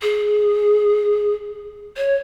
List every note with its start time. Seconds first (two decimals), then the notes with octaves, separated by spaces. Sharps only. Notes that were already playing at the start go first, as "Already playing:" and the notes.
0.01 G#4
1.96 C#5